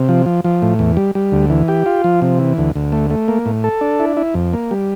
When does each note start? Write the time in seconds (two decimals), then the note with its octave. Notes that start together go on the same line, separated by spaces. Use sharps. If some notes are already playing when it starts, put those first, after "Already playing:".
Already playing: C3
0.09 F3
0.26 F3
0.44 F3
0.62 A2
0.79 E2
0.97 G3
1.15 G3
1.32 D2
1.50 E3
1.68 G4
1.86 F4
2.04 F3
2.22 C3
2.39 E3
2.58 D2
2.76 D2
2.92 A3
3.10 A3
3.28 A#3
3.46 A2
3.64 A4
3.81 D4
4.00 E4
4.17 E4
4.34 F2
4.53 A#3
4.71 G3